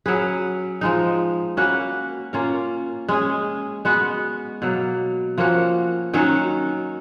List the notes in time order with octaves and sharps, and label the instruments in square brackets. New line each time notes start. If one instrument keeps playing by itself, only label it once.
[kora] F#3 C#4 G#4 B4
F3 G#3 D#4
A#3 C#4 F#4 B4
A#3 C#4 F4 A#4
G#3 C#4 G#4
G#3 B3 F#4
B2 F#3 A#3
F3 A#3 C#4 F#4
D#3 F#3 C#4 F#4